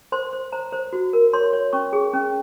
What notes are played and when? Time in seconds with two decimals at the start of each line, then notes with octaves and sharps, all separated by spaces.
0.12 C5 C6
0.33 C5
0.52 C5 A#5
0.72 C5
0.93 F#4
1.13 A#4
1.33 C#5 C6
1.53 C#5
1.73 C#4 C#6
1.93 G#4
2.13 C#4